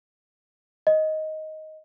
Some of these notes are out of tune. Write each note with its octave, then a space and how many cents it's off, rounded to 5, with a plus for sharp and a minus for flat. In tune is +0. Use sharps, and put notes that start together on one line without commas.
D#5 +10